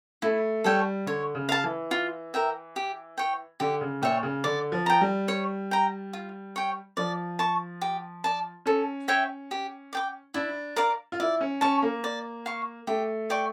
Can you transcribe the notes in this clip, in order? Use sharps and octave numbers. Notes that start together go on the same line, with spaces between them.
A3 E4
G3 A4 C#5 G5
D3 C#5
C#3
F5 A5
E3
F4
A#4 E5 G5
G4
C#5 G5
D3 G4
C#3
A#2 C#5 E5 G5
C#3
D3 D5
F3
G5 A#5
G3
C#5
G5 A#5
F4
C#5 G5
F3 D5
A5 C#6
G4
D5 A5
C#4 A4
C#5 E5 G5
G4
D5 G5 D6
D4 E4
A#4 D5 F5
F4
E4 D5
C#4
C#4 A5 C#6
A#3
D5
F5 C#6
A3 G4
D5 G5 C#6